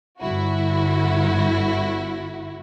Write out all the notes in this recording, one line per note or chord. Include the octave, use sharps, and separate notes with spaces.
G1 E4 F#4